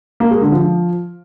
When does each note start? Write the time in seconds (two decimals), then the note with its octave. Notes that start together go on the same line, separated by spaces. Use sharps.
0.20 A#3
0.31 G#3
0.41 D3
0.52 F3